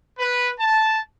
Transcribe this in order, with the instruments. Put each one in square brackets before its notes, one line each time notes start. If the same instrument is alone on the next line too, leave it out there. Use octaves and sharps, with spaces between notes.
[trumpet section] B4
A5